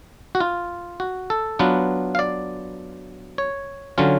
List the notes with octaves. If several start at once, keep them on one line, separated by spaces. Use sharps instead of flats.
F#4
F4
F#4
A4
F#3 B3 D4 F4 B4
F5
D5
C#5
D3 F#3 C#4 F4